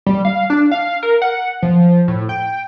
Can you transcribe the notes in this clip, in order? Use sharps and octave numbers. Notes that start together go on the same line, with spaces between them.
G3
F5
D4
F5
A#4
F#5
F3
A2
G5